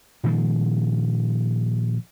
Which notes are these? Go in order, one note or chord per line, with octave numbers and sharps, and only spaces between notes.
A#2 D#3 F3 G#3